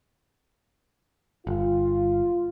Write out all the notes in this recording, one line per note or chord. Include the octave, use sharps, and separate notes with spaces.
G1 F4